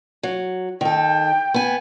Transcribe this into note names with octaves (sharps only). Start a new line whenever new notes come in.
F#3
D#3 A4 G5
B3 G#5